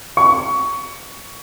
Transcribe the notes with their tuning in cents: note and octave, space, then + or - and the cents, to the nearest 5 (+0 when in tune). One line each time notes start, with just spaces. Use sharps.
C#6 +20